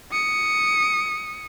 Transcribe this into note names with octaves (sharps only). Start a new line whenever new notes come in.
D#6 C#7